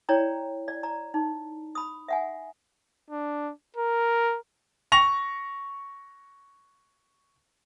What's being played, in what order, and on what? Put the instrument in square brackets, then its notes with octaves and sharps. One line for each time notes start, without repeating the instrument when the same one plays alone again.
[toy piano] E4 C#5 D5 G5 A#5
D5
D5 A#5
D#4
B5 D#6
E5 F#5 G#5
[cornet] D4
A#4
[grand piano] C#6 A#6 F7